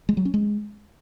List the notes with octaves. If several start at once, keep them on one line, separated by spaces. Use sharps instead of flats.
G#3
F#3
C#4
G#3